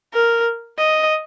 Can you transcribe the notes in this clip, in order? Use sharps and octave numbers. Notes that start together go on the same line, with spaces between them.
A#4
D#5